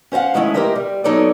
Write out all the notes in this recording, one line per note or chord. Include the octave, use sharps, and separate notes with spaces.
C#4 C5 D#5 F5 F#5
D#3 F3 G#3 A3 C#4 E4
G4 A4 A#4 C5 D#5 E5
G3
F#3 B3 D#4 A4 C#5 D5